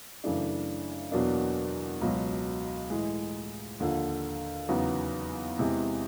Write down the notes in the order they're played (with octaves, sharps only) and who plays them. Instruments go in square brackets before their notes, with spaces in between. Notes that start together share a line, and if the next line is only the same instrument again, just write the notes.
[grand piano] F#2 C#3 E3 A3 D4
E2 B2 F#3 A#3 D4
C#2 B2 F#3
A2 E3 G#3
D#2 D3 F3
E2 C#3 F#3 B3 D#4
E2 C3 E3 G#3